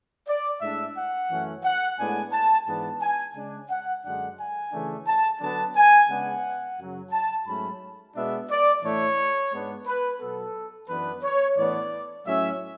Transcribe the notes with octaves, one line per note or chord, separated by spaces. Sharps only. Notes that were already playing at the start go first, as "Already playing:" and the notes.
D5
A2 G#3 D4 E5
F#5
F#2 E3 A3 C#4
F#5
A2 G#3 B3 D4 G#5
A5
G#2 E3 B3 D4 A5
G#5
C#3 G#3 D4
F#5
F#2 D3 G#3 D4 F#5
G#5
C#3 E3 A3 D4
A5
D3 F#3 B3 D4 A5
G#5
C#3 G#3 B3 D4 F#5
F#2 C#3 F#3
A5
G#2 F#3 A3 C#4 B5
B2 G#3 B3 D4 E5
D5
A2 E3 A3 D4 C#5
G#2 G#3 B3 D4
B4
B2 F#3 B3 A4
F#2 E3 B3 D4 B4
C#5
A2 E3 B3 D4 D5
A2 F#3 C#4 E5